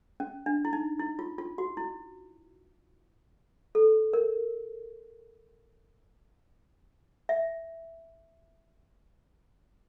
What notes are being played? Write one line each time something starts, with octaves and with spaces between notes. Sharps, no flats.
C#4
D4
E4
D#4
E4
F4
F4
F#4
E4
A4
A#4
E5